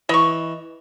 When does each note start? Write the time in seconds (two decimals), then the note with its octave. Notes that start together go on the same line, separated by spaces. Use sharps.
0.09 E3 D#5 C#6